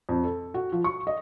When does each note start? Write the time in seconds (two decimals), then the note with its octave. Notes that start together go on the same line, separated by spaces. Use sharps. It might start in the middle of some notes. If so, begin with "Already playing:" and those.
0.09 F2
0.23 A4
0.54 F#4
0.72 F3
0.84 C#6
1.07 D#5